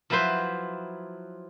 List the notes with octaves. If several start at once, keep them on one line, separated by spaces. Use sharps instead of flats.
F3 F#3 E4 B4 C5